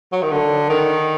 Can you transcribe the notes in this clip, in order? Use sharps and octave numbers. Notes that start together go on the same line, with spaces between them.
F#3
D#3
D3
D#3